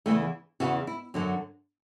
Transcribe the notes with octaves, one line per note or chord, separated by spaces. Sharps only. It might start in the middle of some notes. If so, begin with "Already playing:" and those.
E2 C#3 E3 A3
E2 C#3 E3 F#4
E4
F#2 D3 F#3